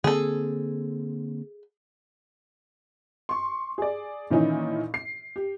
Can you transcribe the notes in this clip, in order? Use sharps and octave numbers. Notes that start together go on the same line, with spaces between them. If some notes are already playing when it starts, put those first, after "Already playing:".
D3 A#3 C4 G#4 A4
C6 C#6
G#4 D5
A#2 D#3 E3 C#4 D#4 E4
C7
G4